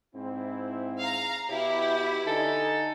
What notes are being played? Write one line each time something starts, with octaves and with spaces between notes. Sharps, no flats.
G#2 C4 E4
F5 A#5
B2 E4 G4
D3 D#4 A4 G#5